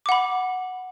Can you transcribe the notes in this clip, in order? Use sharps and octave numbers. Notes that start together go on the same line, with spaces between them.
F#5 B5 D6